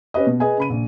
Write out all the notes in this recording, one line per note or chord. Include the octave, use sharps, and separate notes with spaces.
C#4 G4 B4 D#5
B2
G#4 B4 D#5 G#5
C#3 B5 D#7
A#1